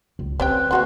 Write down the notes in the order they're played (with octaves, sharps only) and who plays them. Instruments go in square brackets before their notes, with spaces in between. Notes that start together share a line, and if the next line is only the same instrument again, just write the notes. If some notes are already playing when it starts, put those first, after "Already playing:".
[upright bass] C#2
[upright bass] D2 [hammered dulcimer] C4 [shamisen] C#4 G4 G5 [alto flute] B4
[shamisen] A#3 A4 F#5 [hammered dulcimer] F#4 C6